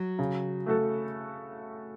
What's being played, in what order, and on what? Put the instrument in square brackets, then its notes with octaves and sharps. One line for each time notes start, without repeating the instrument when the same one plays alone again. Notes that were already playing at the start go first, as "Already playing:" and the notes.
Already playing: [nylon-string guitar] F#3
[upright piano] C#3
A3 F#4 A4